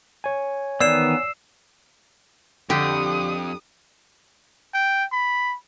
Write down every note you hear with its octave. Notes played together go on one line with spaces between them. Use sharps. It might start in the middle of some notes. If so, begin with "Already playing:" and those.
C#5 G#5
D#3 E3 B3 D5 E6 C7 E7
F2 D3 G4 D#6
G5
B5